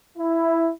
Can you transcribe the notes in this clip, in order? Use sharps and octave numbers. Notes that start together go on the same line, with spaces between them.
E4